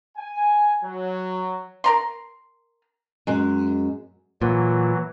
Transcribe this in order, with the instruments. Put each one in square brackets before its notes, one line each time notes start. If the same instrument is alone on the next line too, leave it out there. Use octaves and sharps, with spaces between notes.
[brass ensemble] G#5
F#3
[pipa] A#4 A#5 C6
[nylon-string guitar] F#2 G#3
[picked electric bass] A#2 [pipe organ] E3 F#3